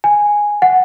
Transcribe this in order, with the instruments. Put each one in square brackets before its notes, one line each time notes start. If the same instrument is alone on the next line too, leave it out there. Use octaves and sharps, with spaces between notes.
[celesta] G#5
F#5